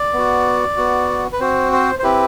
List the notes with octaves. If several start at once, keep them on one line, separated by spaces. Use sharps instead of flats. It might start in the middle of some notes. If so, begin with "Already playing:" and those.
Already playing: D5
B3
F#4
B3 F#4
B4
C4 F#4 C5
C5
C5
C4 E4 G4 B4